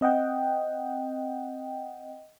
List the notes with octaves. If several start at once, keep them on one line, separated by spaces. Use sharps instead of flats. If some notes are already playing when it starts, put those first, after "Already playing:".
C4 D#5 F#5 G5